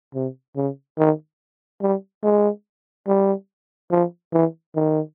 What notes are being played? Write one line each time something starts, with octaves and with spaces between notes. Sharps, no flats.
C3
C#3
D#3
G3
G#3
G3
F3
E3
D#3